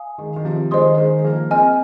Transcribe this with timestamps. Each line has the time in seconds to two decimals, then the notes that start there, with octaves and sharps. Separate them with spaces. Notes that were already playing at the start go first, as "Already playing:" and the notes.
Already playing: F5 G#5 D#6
0.18 D#3 G#3
0.36 D#3
0.45 C3 F3
0.71 D#3 G#3 C5 D#5 C6 D#6
0.98 D#3 G#3
1.19 G#3
1.24 F3 A#3
1.51 G#3 C4 D#5 G#5 F6